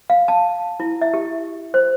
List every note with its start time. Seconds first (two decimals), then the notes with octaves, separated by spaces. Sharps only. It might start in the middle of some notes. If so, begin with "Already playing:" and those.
0.10 F5
0.28 A5
0.80 E4
1.01 E5
1.14 G4
1.74 C5